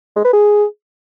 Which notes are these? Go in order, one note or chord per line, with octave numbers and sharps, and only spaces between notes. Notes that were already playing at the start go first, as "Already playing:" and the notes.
G#3
B4
G#4